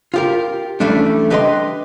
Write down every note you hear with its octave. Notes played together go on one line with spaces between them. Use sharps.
F4 G4 A#4
E3 G3 A3 C#4 D4
D4 G4 B4 D#5 G5 C6